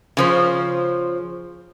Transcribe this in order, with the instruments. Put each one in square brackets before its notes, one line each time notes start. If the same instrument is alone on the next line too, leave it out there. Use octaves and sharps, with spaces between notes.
[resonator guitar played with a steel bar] C#3 F3 C5